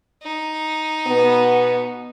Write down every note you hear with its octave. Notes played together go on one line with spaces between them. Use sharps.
D#4
B2 B3